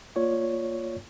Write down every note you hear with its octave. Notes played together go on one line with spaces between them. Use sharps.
A#3 F4 C#5 D5